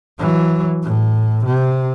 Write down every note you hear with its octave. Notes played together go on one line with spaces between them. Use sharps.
E3 F#3
A2
C3